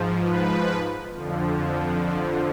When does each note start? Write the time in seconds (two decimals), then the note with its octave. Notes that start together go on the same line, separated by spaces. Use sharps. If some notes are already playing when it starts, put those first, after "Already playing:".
Already playing: G#2 F3
0.20 B4
1.12 F2 D3 F3
2.05 D5